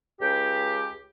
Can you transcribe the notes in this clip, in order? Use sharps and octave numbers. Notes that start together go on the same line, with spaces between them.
C#2 G4